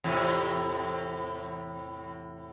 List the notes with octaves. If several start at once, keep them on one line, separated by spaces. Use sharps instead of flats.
E2 A2 C3